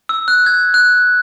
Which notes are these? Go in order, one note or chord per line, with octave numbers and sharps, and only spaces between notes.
E6
F#6
G#6
F#6